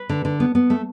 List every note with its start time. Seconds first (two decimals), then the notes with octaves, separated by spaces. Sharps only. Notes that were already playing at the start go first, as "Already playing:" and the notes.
Already playing: B4
0.09 D3
0.25 D3
0.40 B3
0.55 B3
0.70 A3